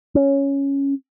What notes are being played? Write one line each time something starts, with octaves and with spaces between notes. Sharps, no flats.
C#4